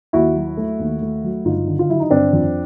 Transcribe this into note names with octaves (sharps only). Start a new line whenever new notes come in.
D#2 E4 F#4
F#3
A3
D#2
A3
F#3
G1 D#4 F4
D3
F4
F#3 E4
D#4
G1 C4 D4
F2